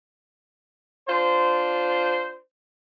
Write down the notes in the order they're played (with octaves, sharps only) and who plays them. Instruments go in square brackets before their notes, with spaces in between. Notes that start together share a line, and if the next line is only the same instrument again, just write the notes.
[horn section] D4 F4 C5